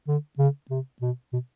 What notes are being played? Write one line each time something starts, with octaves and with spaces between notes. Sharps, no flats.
D3
C#3
C3
B2
B2